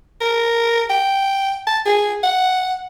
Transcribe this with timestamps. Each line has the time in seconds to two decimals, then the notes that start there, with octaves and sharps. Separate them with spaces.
0.21 A#4
0.90 G5
1.67 A5
1.86 G#4
2.23 F#5